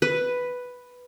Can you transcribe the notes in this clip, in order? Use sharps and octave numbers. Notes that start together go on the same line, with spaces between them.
B4